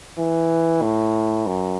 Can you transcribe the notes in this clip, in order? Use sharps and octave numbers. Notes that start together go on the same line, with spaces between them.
E3
A2
F#2